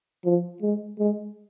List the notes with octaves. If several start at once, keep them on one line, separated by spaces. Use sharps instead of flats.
F3
G#3
G#3